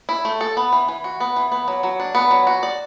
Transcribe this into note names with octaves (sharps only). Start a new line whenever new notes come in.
E4
A3
A4
B3
E3
E3
F#4
B3
E3
B3
F#3
F#3
D4
B3
F#3
F#4
D5